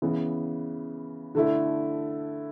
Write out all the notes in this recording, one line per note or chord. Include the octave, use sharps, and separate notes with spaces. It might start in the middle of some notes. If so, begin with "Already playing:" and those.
C#3 E3 B3
D3 A3 E4